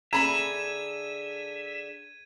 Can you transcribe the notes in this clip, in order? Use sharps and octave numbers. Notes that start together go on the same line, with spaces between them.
D3 G#4 A4 E5 A#5 B5 G#6 D#7